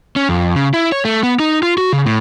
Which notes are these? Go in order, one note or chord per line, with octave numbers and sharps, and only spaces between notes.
C#4
F2
C#3
E4
C#5
A3
B3
D#4
F4
F#4
C#3
A2